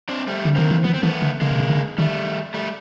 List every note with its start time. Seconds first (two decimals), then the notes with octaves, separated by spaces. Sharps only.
0.09 C4 D4
0.27 G3 A3
0.45 D3
0.56 D#3 A#3 C4
0.71 E3
0.84 F3 B3
0.94 C4
1.03 E3 A3 B3
1.22 D3
1.41 C#3 G#3 A#3
1.51 C3
1.60 C#3
1.70 D3
1.98 D#3 G3 A3
2.54 G3 A3